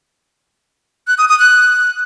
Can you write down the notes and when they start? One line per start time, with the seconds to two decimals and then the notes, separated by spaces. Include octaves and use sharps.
1.08 F#6
1.18 D#6
1.29 D#6
1.40 F#6